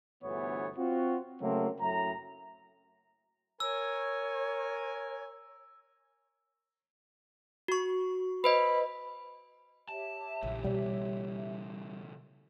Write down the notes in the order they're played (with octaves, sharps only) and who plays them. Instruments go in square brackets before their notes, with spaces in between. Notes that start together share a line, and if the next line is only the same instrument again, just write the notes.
[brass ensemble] G1 D2 B2 E3 B3 C#5
C4 F4 F#4
C#3 F#3 A3 A#3 C4
F#2 A2 E5 A#5
[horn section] A#4 G#5 [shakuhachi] C#5 [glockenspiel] E6
[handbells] F#4 C#6
[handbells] B4 C5 D#5 [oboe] B5
[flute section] G4 C#5 E5 [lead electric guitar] A5
[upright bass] A#1 [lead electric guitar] C#3 E3
[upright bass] B2 A#3 [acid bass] G3